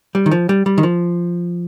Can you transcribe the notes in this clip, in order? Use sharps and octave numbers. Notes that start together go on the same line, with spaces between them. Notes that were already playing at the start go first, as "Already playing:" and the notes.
G3
D#3
F3
G3
G3
D#3
F3